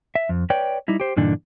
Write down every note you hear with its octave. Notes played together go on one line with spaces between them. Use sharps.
E5
F2
B4 C#5 D5 G5
G3 D#4 E4
G4 C5
G2 A#2 D3 E3 D4 D#4